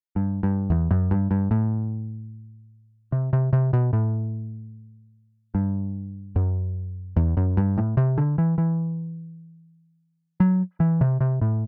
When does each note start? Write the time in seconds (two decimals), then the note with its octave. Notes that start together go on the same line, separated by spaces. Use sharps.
0.16 G2
0.43 G2
0.70 E2
0.91 F#2
1.11 G2
1.31 G2
1.51 A2
3.12 C3
3.33 C3
3.53 C3
3.73 B2
3.93 A2
5.55 G2
6.36 F#2
7.17 E2
7.37 F#2
7.57 G2
7.77 A2
7.97 C3
8.18 D3
8.38 E3
8.58 E3
10.40 F#3
10.80 E3
11.01 C3
11.21 C3
11.41 A2